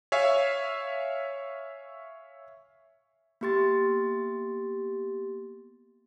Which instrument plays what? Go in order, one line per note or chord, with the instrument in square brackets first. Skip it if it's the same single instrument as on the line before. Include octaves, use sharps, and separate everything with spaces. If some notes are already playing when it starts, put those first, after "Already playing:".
[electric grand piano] C#5 E5 F5 G#5
[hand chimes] A#3 B3 G4 C6 A6